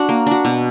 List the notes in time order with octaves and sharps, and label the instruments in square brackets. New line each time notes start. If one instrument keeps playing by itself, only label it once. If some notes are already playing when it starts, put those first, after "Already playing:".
Already playing: [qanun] D4 F#4
A#3
D4 F#4
B2